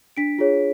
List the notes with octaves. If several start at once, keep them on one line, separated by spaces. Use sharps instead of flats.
D4 B6 D7
F4 G#4 C#5